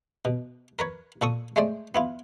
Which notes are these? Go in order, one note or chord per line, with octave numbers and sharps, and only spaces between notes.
B2
A#4 B4 C#5
A#2 A4 C#6 D#6
G#3 A3 C5 D5
B3 E4 F4